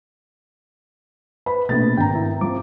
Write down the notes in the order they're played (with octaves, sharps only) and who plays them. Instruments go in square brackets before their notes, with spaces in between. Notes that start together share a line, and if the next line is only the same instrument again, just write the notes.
[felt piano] B4 C5 B5
[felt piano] A#1 A6 [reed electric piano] B2 A3 B3
[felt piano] G#1 A#5 [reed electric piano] G5
[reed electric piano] E4
[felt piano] F3 C4 [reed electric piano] D6